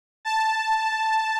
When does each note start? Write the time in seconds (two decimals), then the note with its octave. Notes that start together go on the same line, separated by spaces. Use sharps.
0.25 A5